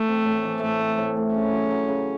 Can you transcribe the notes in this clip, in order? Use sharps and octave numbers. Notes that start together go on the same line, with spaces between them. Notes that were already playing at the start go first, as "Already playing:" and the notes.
Already playing: E3 A3
C4
A2
E3
A2 A3
C4
A2
A2
C#3 C#4
F#3
F#3
C#3